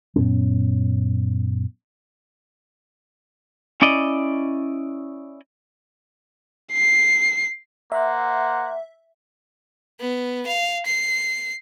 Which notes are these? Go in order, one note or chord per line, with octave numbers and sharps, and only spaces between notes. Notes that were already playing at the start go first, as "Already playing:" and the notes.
F#2 A#2 B3 C#4
C#4 E4 D5 D#5
C7
A#3 C5 E5 F#5
B3
F5
C7